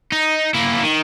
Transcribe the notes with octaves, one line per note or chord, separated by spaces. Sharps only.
D#4
A#3 E4
D#3